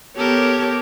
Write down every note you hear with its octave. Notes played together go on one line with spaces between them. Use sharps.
B3 G4 A4 A#4 C#5